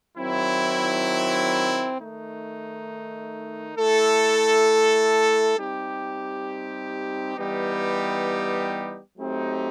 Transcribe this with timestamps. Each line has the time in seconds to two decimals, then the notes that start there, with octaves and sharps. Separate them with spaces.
0.17 D#3 F#3 C4 E4
1.97 D#3 A3 D#4
3.76 A3 E4 A4
5.56 G3 C4 D#4 G4
7.37 E3 G3 B3 D#4 G4
9.16 F#3 A3 C4 D#4 G4